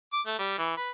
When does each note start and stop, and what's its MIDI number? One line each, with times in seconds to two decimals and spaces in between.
0.13 0.21 86
0.26 0.38 57
0.39 0.57 55
0.58 0.74 52
0.77 0.90 71